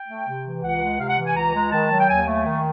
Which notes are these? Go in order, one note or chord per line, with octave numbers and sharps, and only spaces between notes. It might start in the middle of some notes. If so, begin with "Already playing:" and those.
Already playing: G5
A3
C3
E3
C#2 F#5
G#3
C3 F5
F#5
E3
G#5
C#2 A#5
G#3
D#3 A5
F#3
G5
D#2 G#5
A3
D#3